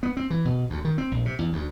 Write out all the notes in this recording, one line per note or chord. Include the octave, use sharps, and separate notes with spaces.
B3
C4
E3
B2
D2
D#3
C4
A#1
C3
E2
D2